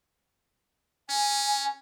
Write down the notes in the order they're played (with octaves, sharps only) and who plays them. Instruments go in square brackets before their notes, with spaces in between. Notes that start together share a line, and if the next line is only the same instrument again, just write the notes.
[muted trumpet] C#4 [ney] G#5